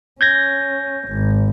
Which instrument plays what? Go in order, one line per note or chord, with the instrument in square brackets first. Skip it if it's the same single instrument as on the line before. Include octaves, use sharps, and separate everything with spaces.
[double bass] C#4 [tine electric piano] G6 G#6 A#6
[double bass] G#1